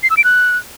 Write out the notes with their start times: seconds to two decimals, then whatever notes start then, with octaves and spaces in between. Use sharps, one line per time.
0.03 C7
0.10 E6
0.17 D7
0.24 F#6